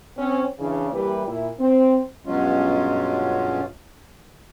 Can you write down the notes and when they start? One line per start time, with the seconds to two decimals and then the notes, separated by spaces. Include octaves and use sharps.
0.17 C4 C#4
0.59 C#3 E3 D4
0.92 E3 G3 A#3 E4 G4 B4
1.28 A#2 E4
1.60 C4
2.26 G2 B2 F#3 G#3 C#4 F4